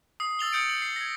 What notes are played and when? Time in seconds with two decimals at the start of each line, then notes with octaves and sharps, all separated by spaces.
0.20 D#6 C7
0.39 E6 A6 F7 G7
0.53 D#6 G6 C#7 D7
0.70 F#7
0.82 C7
0.96 G#6 A#6